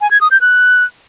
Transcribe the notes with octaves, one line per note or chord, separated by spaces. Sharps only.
G#5
G#6
D#6
G6
F#6